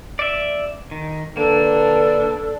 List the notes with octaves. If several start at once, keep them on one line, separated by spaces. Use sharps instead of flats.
D5 E5
D#3
D3 A#3 D4 A4 B4